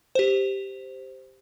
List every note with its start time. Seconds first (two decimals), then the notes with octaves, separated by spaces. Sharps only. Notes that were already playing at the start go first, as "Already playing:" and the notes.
0.15 G4 C5